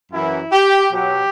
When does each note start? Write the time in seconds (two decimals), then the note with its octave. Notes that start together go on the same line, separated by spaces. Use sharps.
0.12 F#2 E3 E4
0.52 G4
0.92 B2 F#3 G4